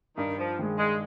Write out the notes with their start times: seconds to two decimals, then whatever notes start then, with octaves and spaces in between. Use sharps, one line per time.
0.17 G2 D#3
0.38 F3
0.59 D#3 G#3
0.79 G#3